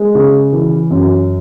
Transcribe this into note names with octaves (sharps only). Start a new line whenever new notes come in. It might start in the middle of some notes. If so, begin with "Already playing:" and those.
Already playing: G#3
C#3
E3
F#2